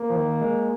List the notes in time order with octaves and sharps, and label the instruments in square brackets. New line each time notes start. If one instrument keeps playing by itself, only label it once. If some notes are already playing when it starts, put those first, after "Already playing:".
Already playing: [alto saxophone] A#3
[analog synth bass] F3
D#3
G#3